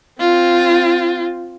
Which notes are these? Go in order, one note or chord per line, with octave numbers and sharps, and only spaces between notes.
C4 F4